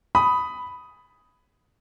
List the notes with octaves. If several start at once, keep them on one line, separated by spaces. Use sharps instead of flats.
B5 D#6